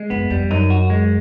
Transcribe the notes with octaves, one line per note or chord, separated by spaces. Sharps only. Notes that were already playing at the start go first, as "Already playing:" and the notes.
Already playing: G#3
F#2 B3
F2 G3
F#2 D#4
F#4
G#3